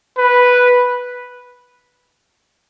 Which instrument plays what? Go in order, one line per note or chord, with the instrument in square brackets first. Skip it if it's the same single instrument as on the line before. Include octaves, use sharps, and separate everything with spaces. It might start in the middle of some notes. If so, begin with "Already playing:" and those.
[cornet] B4